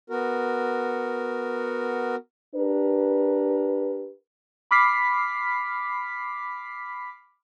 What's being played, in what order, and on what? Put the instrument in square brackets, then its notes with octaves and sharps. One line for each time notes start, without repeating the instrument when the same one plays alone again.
[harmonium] B3 F#4 A#4
[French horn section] D4 G4 A#4 B4
[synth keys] B5 D6 F6 B6 C7